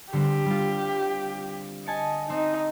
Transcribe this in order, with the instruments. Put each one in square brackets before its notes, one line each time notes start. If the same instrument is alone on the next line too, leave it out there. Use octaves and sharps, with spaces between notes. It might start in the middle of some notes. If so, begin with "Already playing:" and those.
[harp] D3 G3 C4 [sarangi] G4
[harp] G3 F4
[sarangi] D#5 [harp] G#5 A5 C#7
[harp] C4 [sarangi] D#4